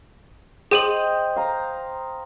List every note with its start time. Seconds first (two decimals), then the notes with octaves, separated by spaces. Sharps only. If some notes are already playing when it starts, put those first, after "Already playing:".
0.71 G#4 C5 D#5 G5 D#7 F#7
1.36 F5 A#5